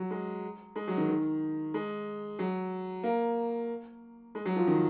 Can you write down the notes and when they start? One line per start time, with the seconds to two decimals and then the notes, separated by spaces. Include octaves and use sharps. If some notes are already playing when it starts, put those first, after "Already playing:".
Already playing: F#3
0.11 G#3
0.76 G#3
0.88 F#3
0.97 D#3
1.09 D#3
1.74 G#3
2.39 F#3
3.04 A#3
4.35 G#3
4.46 F#3
4.56 F3
4.67 D#3